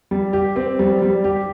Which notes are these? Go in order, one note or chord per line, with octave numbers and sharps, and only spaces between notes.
G3
G4
C4
G3
G3
G4